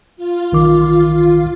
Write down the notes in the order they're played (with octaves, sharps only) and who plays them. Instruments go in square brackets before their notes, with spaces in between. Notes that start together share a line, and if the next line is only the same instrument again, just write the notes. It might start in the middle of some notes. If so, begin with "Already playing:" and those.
[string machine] F4
[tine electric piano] B1 D#3 D6